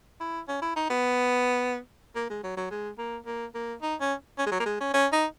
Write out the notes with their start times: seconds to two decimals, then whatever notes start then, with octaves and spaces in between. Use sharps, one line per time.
0.21 E4
0.48 C#4
0.62 E4
0.76 D#4
0.90 B3
2.15 A#3
2.30 G#3
2.43 F#3
2.57 F#3
2.70 G#3
2.98 A#3
3.26 A#3
3.55 A#3
3.82 D#4
4.01 C#4
4.38 C#4
4.46 G#3
4.52 F#3
4.60 A#3
4.66 G#3
4.80 C#4
4.94 C#4
5.13 D#4